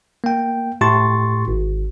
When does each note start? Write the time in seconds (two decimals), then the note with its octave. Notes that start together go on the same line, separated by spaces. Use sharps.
0.24 A#3 G5
0.81 A2 G4 C6 C#6 A6
1.48 G#1